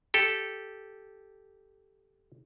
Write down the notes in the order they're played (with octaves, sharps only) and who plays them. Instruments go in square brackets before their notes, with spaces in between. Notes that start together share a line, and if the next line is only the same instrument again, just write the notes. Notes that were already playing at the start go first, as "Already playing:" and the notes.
[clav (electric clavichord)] G4 A4